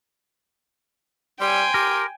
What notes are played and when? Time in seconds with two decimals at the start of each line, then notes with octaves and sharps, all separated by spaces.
1.40 G3 G5 G#5 C6
1.74 G4 A#4